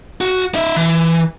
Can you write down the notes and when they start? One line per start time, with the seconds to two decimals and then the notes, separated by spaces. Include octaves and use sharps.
0.21 F#4
0.54 D#4 E5
0.76 E3